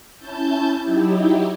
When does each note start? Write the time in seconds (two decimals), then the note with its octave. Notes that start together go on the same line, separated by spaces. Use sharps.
0.17 C#4 E4 A5 G6
0.81 F#3 D#4 E4 G4